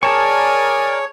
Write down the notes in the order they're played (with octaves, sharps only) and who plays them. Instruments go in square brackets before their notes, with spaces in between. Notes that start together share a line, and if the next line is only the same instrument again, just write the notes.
[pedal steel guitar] G#4 A5 C#6 [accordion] A#4 D5 [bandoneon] C#5 [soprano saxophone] G#5